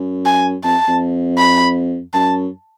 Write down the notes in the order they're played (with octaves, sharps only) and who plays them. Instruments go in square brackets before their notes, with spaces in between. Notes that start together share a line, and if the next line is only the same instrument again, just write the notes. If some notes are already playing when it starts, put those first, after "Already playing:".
Already playing: [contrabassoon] F#2
[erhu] G#5
[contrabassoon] F2 [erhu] A5
[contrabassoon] F2
[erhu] B5
[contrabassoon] F#2 [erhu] A5